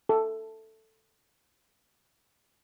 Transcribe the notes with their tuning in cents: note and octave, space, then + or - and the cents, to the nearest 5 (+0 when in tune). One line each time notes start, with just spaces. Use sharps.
A4 +10